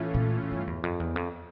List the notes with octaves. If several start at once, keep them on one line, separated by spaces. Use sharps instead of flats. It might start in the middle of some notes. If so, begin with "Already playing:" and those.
Already playing: A2 E3 A3 C#4 F4
A#2
G2
E2
F2
E2
F2